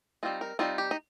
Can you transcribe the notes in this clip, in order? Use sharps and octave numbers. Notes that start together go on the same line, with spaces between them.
G3 C4 D#4 F4
A#4
G3 C4 D#4 F4
G4
D#4